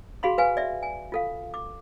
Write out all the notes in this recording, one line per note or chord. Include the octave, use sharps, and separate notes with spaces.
F#4 G#4 F5 B5 C6
B4 F5 G#5
D5 E5
G#5
F4 A4 F5
D6